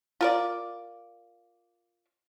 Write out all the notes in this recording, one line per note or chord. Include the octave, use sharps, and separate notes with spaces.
F4 A#4 D5